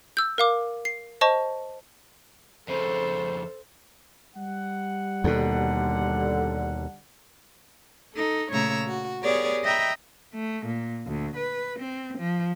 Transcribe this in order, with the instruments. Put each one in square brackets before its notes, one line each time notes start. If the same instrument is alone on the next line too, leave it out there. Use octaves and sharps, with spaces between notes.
[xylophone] E6 G6
A#4 F5 D6
C7
C5 D#5 A5 C#6
[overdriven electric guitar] F2 C#3 [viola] A4 [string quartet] C5
[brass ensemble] G3 F#5
[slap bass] D#2 B2 [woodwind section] D3
[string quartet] D#4 A4
A#2 C#3 A3 C#5 A#5 E6
F#4
B3 G4 G#4 A#4 C#5 D5
D#5 E5 G5 A#5 B5
[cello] A3
A#2
D2
B4
C4
F3